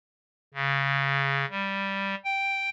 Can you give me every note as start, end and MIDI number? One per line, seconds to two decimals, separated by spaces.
0.54 1.45 49
1.50 2.15 55
2.25 2.70 79